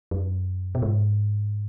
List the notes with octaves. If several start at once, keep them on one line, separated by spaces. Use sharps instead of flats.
F#2
B2
G#2